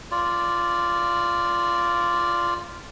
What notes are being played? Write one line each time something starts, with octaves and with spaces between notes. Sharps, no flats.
F4 D5